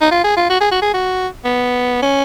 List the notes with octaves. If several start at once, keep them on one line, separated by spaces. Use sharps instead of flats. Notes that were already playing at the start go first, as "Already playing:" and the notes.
D#4
F4
G#4
F4
F#4
G#4
F#4
G#4
F#4
B3
C#4